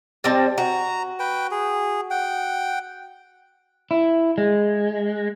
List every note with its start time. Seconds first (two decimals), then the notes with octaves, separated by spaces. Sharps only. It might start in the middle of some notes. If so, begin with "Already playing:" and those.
0.24 G3 C4 A5
0.58 F#4 A#5
1.19 B4 G5
1.51 G#4
2.11 F#5 G5
3.91 E4
4.38 G#3